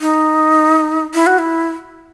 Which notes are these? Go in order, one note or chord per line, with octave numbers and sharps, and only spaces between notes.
D#4
E4
F#4
E4